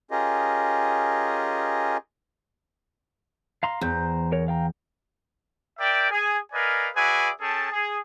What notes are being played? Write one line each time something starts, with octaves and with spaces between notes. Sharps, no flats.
C#4 F4 G4 G#4 A#4 D#5
F5 A#5 C6
E2 C5 A#5 G6
A#4 C#5
F5 G5 A#5
A#4 D5 E5 G5
G#4 G#5
A#4 B4 D5 D#5 F5 G#5
F#4 G#4 B4 D5 E5 G#5
C#4 G#4 A4 G5 A5
G#4